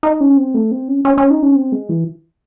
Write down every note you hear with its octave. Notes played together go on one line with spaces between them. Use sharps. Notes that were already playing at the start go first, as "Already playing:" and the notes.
D#4
C#4
C4
A3
C4
C#4
C#4
C#4
D#4
C#4
C4
G#3
E3